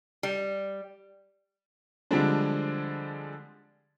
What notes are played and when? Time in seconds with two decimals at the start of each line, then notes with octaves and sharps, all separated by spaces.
0.23 G3
2.11 D3 F3 G3 G#3 C4 D4